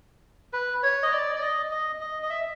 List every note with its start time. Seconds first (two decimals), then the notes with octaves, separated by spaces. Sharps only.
0.53 B4
0.83 C#5
1.03 D#5
1.12 D5
1.36 D5
1.41 D#5
1.71 D#5
2.01 D#5
2.23 D#5
2.30 E5